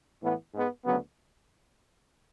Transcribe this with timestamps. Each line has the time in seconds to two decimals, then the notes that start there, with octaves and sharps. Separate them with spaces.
0.21 A2 E3 B3
0.52 G#2 G#3 B3
0.84 D2 C#3 F#3 B3